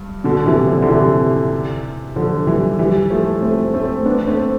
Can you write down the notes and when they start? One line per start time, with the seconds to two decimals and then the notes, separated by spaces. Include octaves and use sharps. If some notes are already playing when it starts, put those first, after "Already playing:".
Already playing: G2
0.24 B2 D3
0.46 C3 E3
0.67 D3 F3
0.82 D3
0.89 C3 E3
2.16 D3 F3
2.47 E3 G3
2.78 E3 G3
3.10 F3 A3
3.42 A3 C4
3.74 A3 C4
4.06 B3 D4
4.27 A3 C4